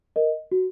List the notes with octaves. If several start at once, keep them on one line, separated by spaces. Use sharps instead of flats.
A#4 D#5
F#4